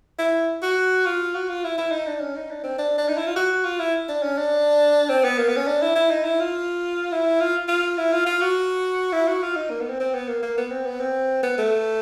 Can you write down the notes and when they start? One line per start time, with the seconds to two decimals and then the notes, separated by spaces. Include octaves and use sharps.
0.19 E4
0.62 F#4
1.06 F4
1.34 F#4
1.49 F4
1.64 E4
1.78 E4
1.92 D#4
2.06 D4
2.20 C#4
2.36 D#4
2.50 D4
2.64 C4
2.78 D4
2.98 D4
3.08 D#4
3.17 E4
3.27 F4
3.36 F#4
3.65 F4
3.79 E4
4.09 D4
4.22 C#4
4.38 D4
5.09 C4
5.24 B3
5.39 A#3
5.48 B3
5.57 C#4
5.67 D4
5.82 E4
5.95 E4
6.11 D#4
6.25 E4
6.40 F4
7.12 E4
7.40 F4
7.68 F4
7.97 E4
8.12 F4
8.26 F4
8.41 F#4
9.12 E4
9.27 F#4
9.42 F4
9.56 D#4
9.70 A#3
9.80 B3
9.89 C4
10.00 C4
10.14 B3
10.28 A#3
10.42 A#3
10.57 B3
10.71 C4
10.86 B3
11.00 C4
11.43 B3
11.58 A3